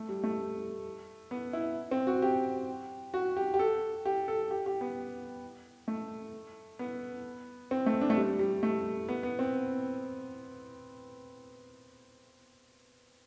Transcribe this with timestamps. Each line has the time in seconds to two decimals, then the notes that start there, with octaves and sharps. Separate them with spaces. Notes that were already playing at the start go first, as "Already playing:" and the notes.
Already playing: A3
0.09 G3
0.24 A3
1.31 B3
1.53 E4
1.91 C4
2.07 F#4
2.22 G4
3.14 F#4
3.37 G4
3.54 G4
3.59 A4
4.06 G4
4.28 A4
4.51 G4
4.66 G4
4.81 B3
5.88 A3
6.79 B3
7.71 C4
7.86 A3
8.01 D4
8.10 A3
8.16 G3
8.39 G3
8.63 A3
9.09 B3
9.23 B3
9.39 C4